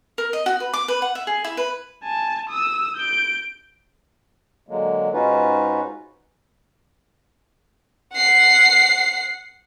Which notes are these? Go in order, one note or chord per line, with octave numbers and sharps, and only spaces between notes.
A#4
D#5
F#4
B4
D6
B4
F#5
E5
G#4
E4
B4
G#5 A5
D#6 E6
G6 D7
D3 F#3 G#3 A#3
G#2 C#4 D#4 F4 F#4 B4
F#5 C7